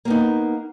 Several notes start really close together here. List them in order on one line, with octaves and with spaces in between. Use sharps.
A#3 B3 D#4